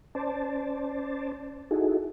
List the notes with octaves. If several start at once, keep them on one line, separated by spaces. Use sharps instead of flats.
C#4 C5 D5 A5
D#4 E4 F#4 G#4 A4